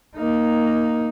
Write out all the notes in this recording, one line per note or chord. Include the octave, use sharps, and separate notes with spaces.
A#3 D#4